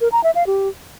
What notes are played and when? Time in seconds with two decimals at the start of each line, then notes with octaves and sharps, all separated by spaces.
0.01 A#4
0.12 A#5
0.24 E5
0.35 F5
0.47 G4